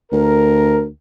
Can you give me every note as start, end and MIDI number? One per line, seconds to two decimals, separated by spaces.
0.12 0.89 38
0.12 0.84 70